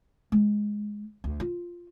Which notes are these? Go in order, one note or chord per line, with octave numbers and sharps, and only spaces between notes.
G#3
D2
F4